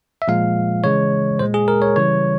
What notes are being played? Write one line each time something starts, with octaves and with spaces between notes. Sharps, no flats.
E5
A#2 F3 G#3 F5
C#3 E3 G#3 C#5
A#2 G#3 C5
G#4
A#4
C#5
C#3 E3 G3 C#5